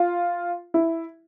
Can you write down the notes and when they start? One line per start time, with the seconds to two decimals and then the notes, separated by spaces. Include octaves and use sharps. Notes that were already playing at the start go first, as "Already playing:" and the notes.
Already playing: F4
0.74 E4